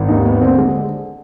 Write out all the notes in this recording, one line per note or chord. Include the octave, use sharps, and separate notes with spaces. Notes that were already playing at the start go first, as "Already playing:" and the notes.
Already playing: G#1
D#2 D#4
B3
D3 C4
G#3